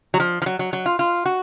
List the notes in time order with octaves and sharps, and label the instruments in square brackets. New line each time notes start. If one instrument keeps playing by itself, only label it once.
[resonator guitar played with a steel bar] F#3
F3
F3
F#3
F#3
F#3
F4
F4
F#4